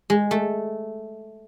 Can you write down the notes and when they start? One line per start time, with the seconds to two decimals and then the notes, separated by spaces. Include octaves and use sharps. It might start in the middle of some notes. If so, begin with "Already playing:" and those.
0.10 G#3
0.31 A3